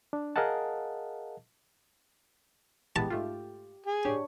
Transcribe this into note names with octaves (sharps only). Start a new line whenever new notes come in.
D4
G#4 A#4 D#5 F5 F#5 A5
E3 G#3 B3 G4 A5
G#2 A3 F4
G#4
D4 G4 C#5